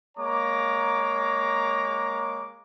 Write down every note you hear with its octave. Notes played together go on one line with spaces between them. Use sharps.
G#3 A#3 C#5 A#5 D6